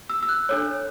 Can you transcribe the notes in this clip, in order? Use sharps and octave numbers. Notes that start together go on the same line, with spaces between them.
E6
E6
F#6
D4 A4 C#5